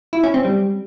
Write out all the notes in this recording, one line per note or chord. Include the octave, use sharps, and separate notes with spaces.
E4
C#4
C4
G3